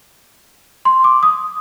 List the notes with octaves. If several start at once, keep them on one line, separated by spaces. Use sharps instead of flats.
C6
D6
D#6